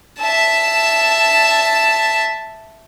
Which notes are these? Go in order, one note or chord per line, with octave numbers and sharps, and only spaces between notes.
E5 A5